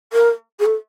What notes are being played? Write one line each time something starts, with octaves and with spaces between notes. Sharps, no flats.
A#4
G#4
A4